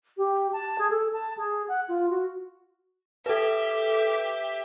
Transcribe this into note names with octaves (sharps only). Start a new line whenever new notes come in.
G4
A5
G#4
A4
A5
G#4
F#5
F4
F#4
G4 A4 B4 E5